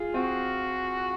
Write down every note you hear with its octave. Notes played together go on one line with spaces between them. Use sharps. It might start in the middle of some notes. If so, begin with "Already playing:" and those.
Already playing: F4 G#4
C4 F#4